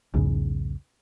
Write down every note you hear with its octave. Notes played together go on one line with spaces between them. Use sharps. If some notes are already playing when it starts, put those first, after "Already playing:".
B1 E2 G#2 C#3